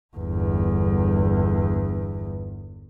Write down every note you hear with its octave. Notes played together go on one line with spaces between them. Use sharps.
G1 E2